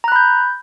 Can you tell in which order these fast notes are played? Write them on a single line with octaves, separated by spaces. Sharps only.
A#5 F#6 B5 G6